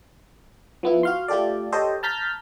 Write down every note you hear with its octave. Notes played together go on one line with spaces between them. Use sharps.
F3 B3 E4
F#4 F5 C6
A3 F4 G4 A4 D5
G4 A4 C5 C#5 D#5
A5 A#5 F6 G6 A6 B6